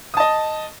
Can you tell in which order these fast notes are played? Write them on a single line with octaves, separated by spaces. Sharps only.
D#6 A5 D#5